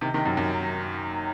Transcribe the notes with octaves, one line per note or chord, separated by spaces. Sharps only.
C3 D#3
C3 D#3
F#2
F#2